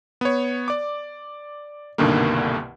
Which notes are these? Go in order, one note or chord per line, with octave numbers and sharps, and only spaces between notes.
B3 C#5
D5 D6
C2 G2 B2 D3 D#3 A#3